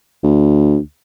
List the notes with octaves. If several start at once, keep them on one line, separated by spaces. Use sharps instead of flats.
D2